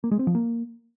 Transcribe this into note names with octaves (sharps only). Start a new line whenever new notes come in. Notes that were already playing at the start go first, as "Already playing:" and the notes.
A#3
G#3
C4
F3
A#3